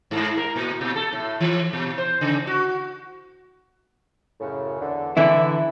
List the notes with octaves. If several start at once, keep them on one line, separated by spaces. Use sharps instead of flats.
G#2
A#4
A#2
B2
A4
A2
E3
B2
C5
C#3
F#4
F#2 A2 C#3
E2 D3
D3 E3 E4 E5